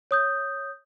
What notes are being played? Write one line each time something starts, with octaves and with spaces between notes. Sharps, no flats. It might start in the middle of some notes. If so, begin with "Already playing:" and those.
C#5 D#6 G6